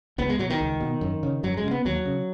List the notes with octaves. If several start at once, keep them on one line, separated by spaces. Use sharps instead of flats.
C#2 B3
G#3
B2 F#3
D#3
C#2
B2
F#2
C#3
F#2 F#3
G#3
C#3
B3
D#2 F#3
C#3